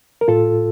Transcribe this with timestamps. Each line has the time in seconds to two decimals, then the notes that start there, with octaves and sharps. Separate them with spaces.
0.21 A#4
0.28 A2 F4 A4